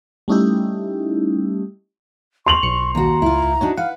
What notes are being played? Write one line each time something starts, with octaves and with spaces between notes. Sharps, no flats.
G3 A3 C#4 D#4 E4 G4
C6 C#6 F7 F#7
B1 C#7
D#2 F#4 A#5
C#2 E4 F4
D4 D#4 F#4 C#5
B4 F5 F#5